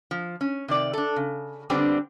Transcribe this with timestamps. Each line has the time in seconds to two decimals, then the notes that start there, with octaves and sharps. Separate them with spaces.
0.11 F3
0.41 C#4
0.68 C3 D#3 D5
0.93 D4 A4
1.16 C#3
1.70 D3 G3 B3 C4 D4